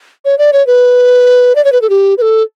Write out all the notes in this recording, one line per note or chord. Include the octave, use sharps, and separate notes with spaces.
C#5
D5
C#5
B4
D5
C#5
B4
A4
G4
B4
A4